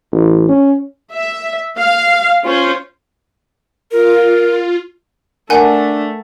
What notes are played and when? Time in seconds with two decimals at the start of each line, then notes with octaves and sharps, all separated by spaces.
0.12 A1
0.49 C#4
1.13 E5
1.78 F5
2.45 C#4 F4 C5
3.91 F4 A#4
5.50 A3 D4 A#4 F#5 G#5